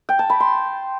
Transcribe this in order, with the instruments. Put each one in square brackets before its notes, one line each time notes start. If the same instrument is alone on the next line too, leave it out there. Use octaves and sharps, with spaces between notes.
[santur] G5
A5
B5
C6